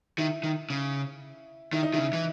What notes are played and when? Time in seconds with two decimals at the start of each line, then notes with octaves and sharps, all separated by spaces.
0.18 D#3 E4
0.43 D#3
0.70 C#3
1.73 D#3 E4
1.83 D#4
1.93 D#3 E4
1.98 C#3
2.13 E3